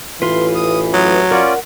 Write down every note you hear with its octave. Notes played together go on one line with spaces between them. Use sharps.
A1 E3 F4 B4 C6
D#6
F#3 D#6
C#4 F4 A#4 D5 F#5